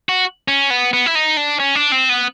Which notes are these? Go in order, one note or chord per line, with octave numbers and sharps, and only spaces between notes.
F#4
C#4
B3
B3
E4
D#4
D4
C#4
D4
C4
B3